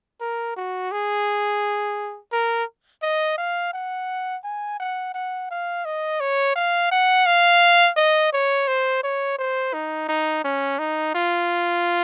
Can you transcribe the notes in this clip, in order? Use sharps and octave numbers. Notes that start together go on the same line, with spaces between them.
A#4
F#4
G#4
A#4
D#5
F5
F#5
G#5
F#5
F#5
F5
D#5
C#5
F5
F#5
F5
D#5
C#5
C5
C#5
C5
D#4
D#4
C#4
D#4
F4